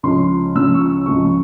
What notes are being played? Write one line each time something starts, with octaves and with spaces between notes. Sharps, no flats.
C#2 C#3 F3 C6
C#2 C#3 F3 E6
C#6
E6
C#2 C#3 F3 C#6
C#6